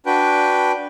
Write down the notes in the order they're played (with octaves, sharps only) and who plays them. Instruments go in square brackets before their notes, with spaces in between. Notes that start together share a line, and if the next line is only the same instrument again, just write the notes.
[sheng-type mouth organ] D4 F#4 B4 G5